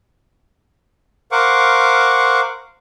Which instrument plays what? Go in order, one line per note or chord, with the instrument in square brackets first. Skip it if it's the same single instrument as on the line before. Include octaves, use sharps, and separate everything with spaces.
[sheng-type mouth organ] A#4 C5 F5 F#5 C#6 D6